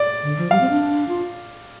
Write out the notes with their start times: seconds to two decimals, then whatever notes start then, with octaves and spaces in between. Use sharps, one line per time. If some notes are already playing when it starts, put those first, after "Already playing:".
Already playing: D5
0.23 D3
0.37 F3
0.51 G3 F5
0.61 C4
0.70 D4
1.08 F4